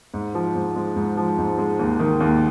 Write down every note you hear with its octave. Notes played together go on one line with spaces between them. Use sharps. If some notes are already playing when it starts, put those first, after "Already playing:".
G#2
F3
G#2
G#3
G#2
F3
G#2
G#3
D#2
D#3
D#2